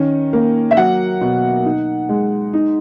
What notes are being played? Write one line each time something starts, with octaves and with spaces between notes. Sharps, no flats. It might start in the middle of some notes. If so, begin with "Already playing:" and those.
Already playing: D#3 C#4
A#3
E5
F#3 F#5
B2
D#4
G#3
D#4